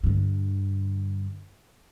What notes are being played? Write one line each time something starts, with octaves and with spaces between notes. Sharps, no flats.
G2 D3